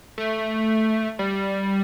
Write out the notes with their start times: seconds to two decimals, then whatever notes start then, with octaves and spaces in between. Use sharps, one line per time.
0.18 A3
1.19 G3